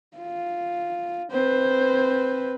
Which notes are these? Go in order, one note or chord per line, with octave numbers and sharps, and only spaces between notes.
F4
C4 B4 C5